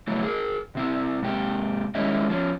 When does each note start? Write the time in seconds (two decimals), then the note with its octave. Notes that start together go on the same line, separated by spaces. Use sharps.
0.07 C#3 E3 F#3 A3
0.23 G#4 A#4
0.75 C3 C4 E4
1.23 G#2 C3 G4
1.95 D#3 G3 G#3 C#4 D#4 E4
2.30 F3 C#4